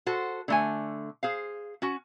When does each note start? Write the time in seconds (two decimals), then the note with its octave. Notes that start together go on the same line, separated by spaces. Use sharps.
0.06 F#4 A4 C5
0.48 D3 A3 G#5
1.23 G#4 C5 F5
1.82 C#4 F#4